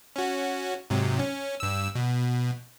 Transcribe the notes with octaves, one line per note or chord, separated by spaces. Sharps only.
C#4 F#4
G#2 C3 F#3
C#4
G2 E6
B2